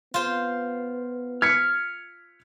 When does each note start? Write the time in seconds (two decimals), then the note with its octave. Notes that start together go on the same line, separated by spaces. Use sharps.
0.14 B3 F4 C5
1.42 F6 G#6 B6 C#7